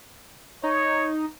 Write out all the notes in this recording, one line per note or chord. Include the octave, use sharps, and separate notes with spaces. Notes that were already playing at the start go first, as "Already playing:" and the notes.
D#4 C#5